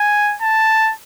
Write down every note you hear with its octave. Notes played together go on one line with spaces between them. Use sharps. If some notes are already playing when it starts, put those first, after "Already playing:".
Already playing: G#5
A5